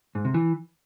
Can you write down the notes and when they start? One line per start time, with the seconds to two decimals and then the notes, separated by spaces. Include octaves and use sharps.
0.15 G#2
0.25 C3
0.34 E3